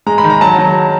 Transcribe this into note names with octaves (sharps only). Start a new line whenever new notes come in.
G#3 A#5
B5
D#3
A#5
F#3 A5
F#3